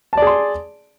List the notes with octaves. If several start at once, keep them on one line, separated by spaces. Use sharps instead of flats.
G#4 D5 A5 C6